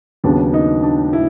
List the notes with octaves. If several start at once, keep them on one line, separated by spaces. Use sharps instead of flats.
D#2 C#3 F#3 B3 D4
D#4
D4
E4